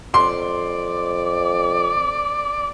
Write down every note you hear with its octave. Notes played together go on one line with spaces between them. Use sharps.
F2 D5 C6